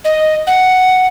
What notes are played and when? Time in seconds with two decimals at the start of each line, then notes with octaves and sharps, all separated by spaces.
0.05 D#5
0.47 F#5